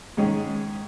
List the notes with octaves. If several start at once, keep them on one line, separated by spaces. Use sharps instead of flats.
G#2 D#3 G#3 C#4 G#4